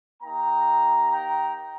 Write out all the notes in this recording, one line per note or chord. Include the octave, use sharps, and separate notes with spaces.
A#3 D#4 G4 G5 A#5
G5 A#5